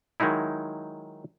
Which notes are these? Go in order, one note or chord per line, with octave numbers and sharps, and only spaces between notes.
D#3 F#3 G#3 D#4 E4